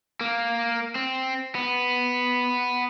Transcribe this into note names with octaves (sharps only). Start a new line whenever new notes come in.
A#3
C4
B3